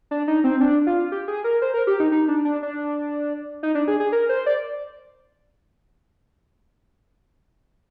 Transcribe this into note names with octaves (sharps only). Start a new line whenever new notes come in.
D4
D#4
C4
D4
F4
G4
G#4
A#4
C5
A#4
G4
D#4
D#4
D4
D4
D4
D#4
D4
G#4
G#4
A#4
C5
D5